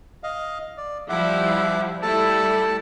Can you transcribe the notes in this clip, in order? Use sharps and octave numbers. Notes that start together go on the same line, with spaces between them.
D#5 F5
D5
F3 G3 E4 E5 F#5 D6
G3 A3 E4 A4 A5